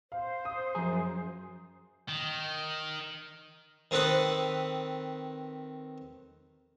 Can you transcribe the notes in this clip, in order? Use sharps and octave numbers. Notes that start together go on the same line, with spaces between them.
C5 F5
D#6
F#2 F3 G#4 A#5
D#3
D#3 C4 A4 B4 B5 D#6